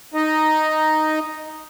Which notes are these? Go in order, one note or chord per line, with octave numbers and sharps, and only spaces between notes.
D#4 D#5